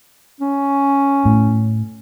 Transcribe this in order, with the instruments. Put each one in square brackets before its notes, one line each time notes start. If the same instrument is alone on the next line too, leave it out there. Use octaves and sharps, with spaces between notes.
[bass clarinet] C#4
[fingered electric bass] A2